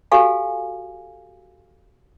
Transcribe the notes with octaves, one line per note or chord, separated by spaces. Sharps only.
F#4 G4 A4 F5 G#5